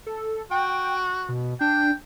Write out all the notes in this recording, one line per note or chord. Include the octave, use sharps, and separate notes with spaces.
A4
F#4 G5
B2
D4 G5